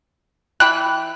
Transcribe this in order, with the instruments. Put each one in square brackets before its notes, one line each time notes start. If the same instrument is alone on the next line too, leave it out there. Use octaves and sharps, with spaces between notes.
[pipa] E3 G5 B5 [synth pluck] F#6